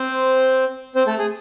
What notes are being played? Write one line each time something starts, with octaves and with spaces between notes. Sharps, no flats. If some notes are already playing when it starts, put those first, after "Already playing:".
Already playing: C4 C5
C4 C5
A3 A4
G#4